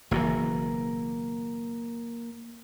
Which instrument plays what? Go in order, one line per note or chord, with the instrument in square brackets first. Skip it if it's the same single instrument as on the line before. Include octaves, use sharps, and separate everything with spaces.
[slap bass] F#1 B2 E3 [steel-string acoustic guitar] A#3